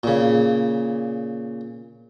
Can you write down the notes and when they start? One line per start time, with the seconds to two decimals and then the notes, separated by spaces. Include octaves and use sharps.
0.03 A#2 C#3